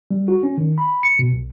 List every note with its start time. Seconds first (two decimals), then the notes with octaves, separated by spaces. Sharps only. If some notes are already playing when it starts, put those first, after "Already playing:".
0.11 G3
0.28 F#4
0.43 C#4
0.58 D#3
0.78 B5
1.03 C#7
1.19 B2
1.33 B1